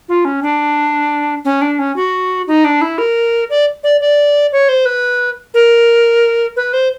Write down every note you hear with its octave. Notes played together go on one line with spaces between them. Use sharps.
F4
C#4
D4
C#4
D4
C#4
F#4
D#4
D4
E4
A#4
D5
D5
D5
C#5
C5
B4
A#4
B4
C5